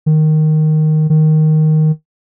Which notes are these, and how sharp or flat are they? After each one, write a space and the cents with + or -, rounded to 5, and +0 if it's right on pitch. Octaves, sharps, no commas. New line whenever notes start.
D#3 -5
D#3 +0